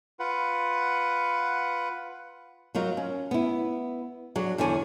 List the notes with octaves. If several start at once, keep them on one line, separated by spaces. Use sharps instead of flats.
F4 B4 F#5
F#3 D#4 F4 A#4
C#4
B3 E4
F#3 D4 G#4
E2 D3 D4 C#5 G#5